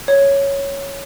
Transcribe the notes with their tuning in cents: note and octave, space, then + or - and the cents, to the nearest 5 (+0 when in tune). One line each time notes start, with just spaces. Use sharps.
C#5 +0